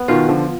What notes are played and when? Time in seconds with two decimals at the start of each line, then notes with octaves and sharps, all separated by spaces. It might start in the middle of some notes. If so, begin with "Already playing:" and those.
Already playing: B3
0.08 B2 D#3 F4
0.28 D3 F3